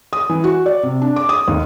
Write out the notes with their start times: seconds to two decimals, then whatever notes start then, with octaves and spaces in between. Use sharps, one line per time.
0.13 D#6
0.29 E3
0.44 F#4
0.66 D5
0.83 C3
1.02 D4
1.16 D6
1.29 D#6
1.48 D#2